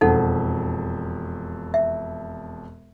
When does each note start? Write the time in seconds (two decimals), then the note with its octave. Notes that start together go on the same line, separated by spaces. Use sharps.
0.01 E1 F2 D#4 A4 F#5
1.74 E5